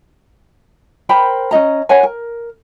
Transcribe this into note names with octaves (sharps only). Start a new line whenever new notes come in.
A#4 C5 G5 B5
C#4 D#4 D#5 A#5
B4 C#5 F#5 G#5
A#4